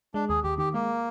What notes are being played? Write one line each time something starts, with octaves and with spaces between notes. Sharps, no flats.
G#3 D4
D#2 G#4
D#2 G4
D#3 G4
G#3 A#3